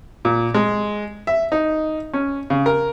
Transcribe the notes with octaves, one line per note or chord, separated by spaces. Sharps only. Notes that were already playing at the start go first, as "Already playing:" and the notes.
A#2
G#3
E5
D#4
C#4
C#3
A#4